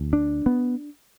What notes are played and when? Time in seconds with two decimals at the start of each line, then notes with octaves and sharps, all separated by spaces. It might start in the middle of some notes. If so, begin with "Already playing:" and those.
Already playing: D2
0.13 D4
0.46 B3